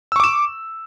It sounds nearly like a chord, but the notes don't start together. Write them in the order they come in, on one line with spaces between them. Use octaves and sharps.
E6 C#6 D6 E7